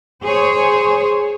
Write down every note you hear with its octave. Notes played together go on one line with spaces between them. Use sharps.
G#4 C5 C#5